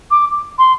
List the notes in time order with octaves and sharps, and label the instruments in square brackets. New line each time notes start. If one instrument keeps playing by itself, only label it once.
[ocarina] D6
C6